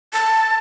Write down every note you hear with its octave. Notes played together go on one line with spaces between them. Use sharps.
A5